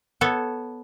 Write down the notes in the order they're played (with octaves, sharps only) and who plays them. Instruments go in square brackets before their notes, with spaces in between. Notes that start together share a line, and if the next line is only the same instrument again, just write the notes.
[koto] B3 A4 C#5